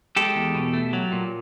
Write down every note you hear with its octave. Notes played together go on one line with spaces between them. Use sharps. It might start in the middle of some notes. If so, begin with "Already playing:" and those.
G#3 G4 A4
E2
B2
A3
F#3
A#2